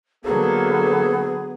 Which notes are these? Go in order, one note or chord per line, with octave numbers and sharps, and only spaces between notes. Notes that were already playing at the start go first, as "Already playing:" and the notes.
D3 F#3 A#3 B3 G#4 A4